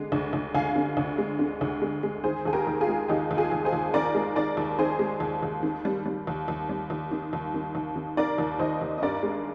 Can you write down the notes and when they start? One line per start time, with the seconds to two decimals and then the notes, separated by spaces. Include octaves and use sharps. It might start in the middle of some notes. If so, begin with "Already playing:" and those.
Already playing: D3 G#3
0.12 D2
0.33 D2
0.55 D2 F5 G#5
0.76 D3
0.97 D2
1.18 G#3
1.39 D3
1.61 D2
1.82 G#3
2.03 G#3
2.24 D#3 G#4 C5
2.45 D#2 G#4
2.53 G4 A#4
2.67 D#2
2.81 F4 G#4
2.87 G#3
3.08 D#2 D#4 G4
3.31 D#2
3.37 F4 G#4
3.52 D#2
3.65 G#4 C5
3.73 D#2
3.94 D#3 A#4 D5
4.15 G#3
4.36 D#3 A#4 D5
4.57 D#2
4.79 D#3 G#4 C5
4.99 G#3
5.20 D#2
5.43 D#2
5.63 D#3
5.85 G3
6.06 G3
6.27 D#2
6.48 D#2
6.69 G3
6.90 D#2
7.11 D#3
7.33 D#2
7.54 D#3
7.75 D#2
7.96 D#3
8.17 D#3 A#4 D5
8.38 D#2
8.59 D#2 C5 D#5
8.81 D#2
8.98 D#5
9.02 G2 A#4 D5
9.23 G#3